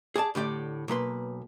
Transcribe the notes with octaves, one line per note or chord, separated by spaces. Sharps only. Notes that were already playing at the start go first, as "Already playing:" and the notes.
G#4 D5 G#5 A5
A2 D3 G4 D5
B1 A#3 B4 C6